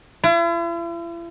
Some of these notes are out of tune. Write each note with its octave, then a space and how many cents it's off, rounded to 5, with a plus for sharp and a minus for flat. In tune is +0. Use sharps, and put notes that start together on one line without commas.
E4 +45